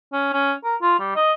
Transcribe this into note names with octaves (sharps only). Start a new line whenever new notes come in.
C#4
C#4
A#4
F4
G3
D#5